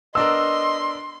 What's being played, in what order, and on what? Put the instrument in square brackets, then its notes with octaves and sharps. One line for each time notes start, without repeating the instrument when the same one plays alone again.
[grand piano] B3 D4 A#4 [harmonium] D#5 [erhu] C6 [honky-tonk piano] E6